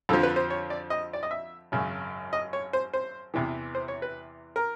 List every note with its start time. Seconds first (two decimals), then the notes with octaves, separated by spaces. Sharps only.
0.09 F2 D3 F3 A4
0.23 B4
0.36 C5
0.50 C#5
0.70 D5
0.90 D#5
1.13 D5
1.23 D#5
1.31 E5
1.72 G#1 F#2 C#3
2.33 D#5
2.53 C#5
2.73 C5
2.93 C5
3.34 E2 C3 E3
3.75 C5
3.88 C#5
4.02 B4
4.56 A#4